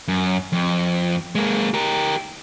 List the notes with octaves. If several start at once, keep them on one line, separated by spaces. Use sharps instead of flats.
F#2
F2
G#3 A#3
G4 A#4